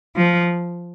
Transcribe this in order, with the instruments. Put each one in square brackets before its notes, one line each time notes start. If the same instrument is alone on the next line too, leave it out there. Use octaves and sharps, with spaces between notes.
[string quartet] F3